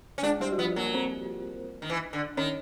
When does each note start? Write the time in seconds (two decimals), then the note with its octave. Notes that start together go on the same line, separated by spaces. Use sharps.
0.18 C#4
0.23 G#3 D4 G#4
0.40 G3 C4 G4
0.52 F#4
0.58 F3 B3 F4
0.76 F#3 A#3 A#4
0.94 C4 C5
1.82 D#3
1.90 E3
2.13 D3
2.37 D#3 C#4 C#5